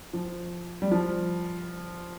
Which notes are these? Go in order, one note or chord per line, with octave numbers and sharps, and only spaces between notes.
F3
G3
F3